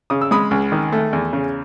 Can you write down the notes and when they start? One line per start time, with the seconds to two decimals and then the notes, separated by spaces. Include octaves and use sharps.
0.10 C#3 D#6
0.21 E6
0.31 G#3 B5 D#6
0.51 C#2
0.72 D#3
0.92 A3
1.13 E2
1.33 C#3